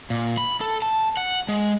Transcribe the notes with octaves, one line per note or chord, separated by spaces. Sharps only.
A#2
B5
A4
A5
F#5
G#3